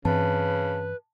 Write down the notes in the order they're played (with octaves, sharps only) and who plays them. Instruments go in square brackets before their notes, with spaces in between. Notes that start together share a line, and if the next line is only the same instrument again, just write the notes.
[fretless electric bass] G2 E3 C4 [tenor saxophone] C#3 [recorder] B4 [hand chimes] A5